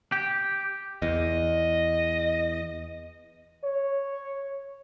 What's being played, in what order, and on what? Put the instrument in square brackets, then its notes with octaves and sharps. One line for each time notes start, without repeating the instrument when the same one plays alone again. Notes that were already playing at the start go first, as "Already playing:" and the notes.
[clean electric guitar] G4
[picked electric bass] E2 [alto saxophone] D#5
[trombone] C#5